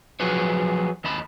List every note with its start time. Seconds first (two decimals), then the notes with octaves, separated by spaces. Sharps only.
0.20 F3 F#3 F#4 G#4 B4 C#5
1.04 D#2 D#5 A5 B5